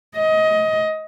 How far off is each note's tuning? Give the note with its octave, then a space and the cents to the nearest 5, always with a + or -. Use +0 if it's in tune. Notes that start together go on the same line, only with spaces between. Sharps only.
D#5 +20